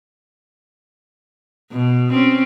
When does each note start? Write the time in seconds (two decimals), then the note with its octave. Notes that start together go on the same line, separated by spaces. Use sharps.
1.71 B2
2.12 C4 C#4